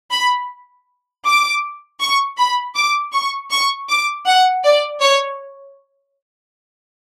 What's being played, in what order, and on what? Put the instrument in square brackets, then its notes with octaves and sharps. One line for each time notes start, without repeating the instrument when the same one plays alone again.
[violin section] B5
D6
C#6
B5
D6
C#6
C#6
D6
F#5
D5
C#5